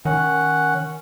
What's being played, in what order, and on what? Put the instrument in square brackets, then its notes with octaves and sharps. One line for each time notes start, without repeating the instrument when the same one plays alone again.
[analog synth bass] D#3 [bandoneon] C#4 F#5